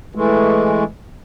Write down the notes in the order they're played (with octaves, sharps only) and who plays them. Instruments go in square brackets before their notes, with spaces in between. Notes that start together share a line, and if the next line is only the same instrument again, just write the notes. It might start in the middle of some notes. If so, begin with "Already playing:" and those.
[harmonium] E3 G#3 A3